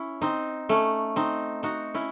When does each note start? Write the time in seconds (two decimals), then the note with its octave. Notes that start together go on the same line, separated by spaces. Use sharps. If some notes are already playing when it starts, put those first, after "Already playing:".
Already playing: C#4 E4
0.21 C4 D#4
0.69 A3 C#4
1.16 C4 D#4
1.63 D#4 F#4
1.94 C#4 E4